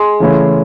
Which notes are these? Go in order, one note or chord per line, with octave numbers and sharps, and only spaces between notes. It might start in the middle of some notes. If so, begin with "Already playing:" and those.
Already playing: G#3
C#3 E3 A3 C#4 E4